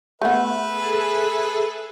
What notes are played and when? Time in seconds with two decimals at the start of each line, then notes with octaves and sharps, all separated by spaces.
0.22 A3 B3 B4 E5
0.67 G#4 A4